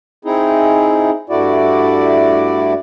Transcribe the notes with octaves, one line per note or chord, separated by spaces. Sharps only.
C4 D#4 E4 G#4
G2 A3 E4 F#4 D5